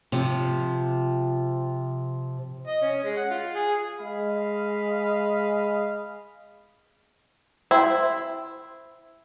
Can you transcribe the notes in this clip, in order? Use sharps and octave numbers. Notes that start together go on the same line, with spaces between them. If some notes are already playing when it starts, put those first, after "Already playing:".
C3 F3
D#5
C#4
G#3
F#5
F4
G#4
G#3 D#5 F5 B5
E4 C5 G5 C6